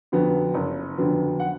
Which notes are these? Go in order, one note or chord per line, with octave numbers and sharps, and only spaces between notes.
F2 D3 F#3 B3
F#1
F2 D3 F#3 B3
F#5